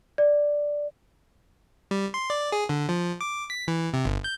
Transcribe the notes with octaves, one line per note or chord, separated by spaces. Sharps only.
D5
G3
C6
D5
G#4
D3
F3
D6
B6
E3
C3
G1
G6